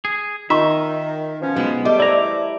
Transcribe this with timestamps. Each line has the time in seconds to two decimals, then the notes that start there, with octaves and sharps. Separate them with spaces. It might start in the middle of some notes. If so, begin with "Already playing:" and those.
0.05 G#4
0.50 D#3 D#4 F4 E5 C6 C#6
1.42 B2 F3 C#4
1.56 B1 G#3 B3
1.85 E2 G3 A3 D#5 D6
2.00 E4 C5 D5 A#5